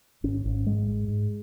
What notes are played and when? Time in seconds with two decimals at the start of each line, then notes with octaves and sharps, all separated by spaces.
0.24 G#1 C#4
0.46 G#1
0.66 G#2 G#3
0.88 G#2
1.08 G#2